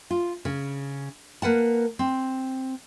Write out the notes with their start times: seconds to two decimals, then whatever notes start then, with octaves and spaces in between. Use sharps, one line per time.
0.11 F4
0.45 C#3
1.42 A#3 B4 F#5 A5
1.99 C4